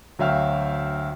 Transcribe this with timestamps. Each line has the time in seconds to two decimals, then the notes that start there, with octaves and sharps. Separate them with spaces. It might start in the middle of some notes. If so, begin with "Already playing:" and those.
0.19 D2 F#3 E5 F5 G5 F6